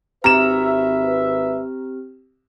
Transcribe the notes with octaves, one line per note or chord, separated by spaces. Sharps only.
G#1 C4 G4 B4 E5 A#5 F6 E7